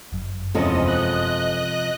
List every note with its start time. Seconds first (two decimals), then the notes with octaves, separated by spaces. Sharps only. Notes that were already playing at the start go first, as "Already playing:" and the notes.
0.12 G1 F#2
0.55 E2 C3 F3 G#3 C#4 A4 D#5
0.85 D#5 F#6